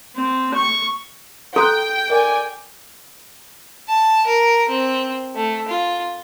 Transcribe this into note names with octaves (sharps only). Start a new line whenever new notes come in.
C4
C#6
A4 G5 A#5 C6 F#6
A#4 D5 G#5
A5
A#4
C4
A3
F4